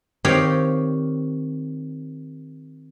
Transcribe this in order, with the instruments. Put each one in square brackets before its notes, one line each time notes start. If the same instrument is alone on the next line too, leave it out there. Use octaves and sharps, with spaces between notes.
[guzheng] D#3 C4 G4 C#5 F5